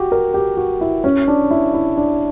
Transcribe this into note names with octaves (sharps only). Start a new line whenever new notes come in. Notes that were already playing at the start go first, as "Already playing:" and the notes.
Already playing: F#4 G4
A#4
G4
F#4
E4
C#4
D4
E4
E4
D4